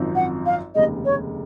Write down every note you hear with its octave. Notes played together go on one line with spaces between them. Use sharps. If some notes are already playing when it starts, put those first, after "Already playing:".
Already playing: G#1 F#2 F3 C4 D#4
F#5
F5
F1 D#2 C#3 G#3 D#5
C#5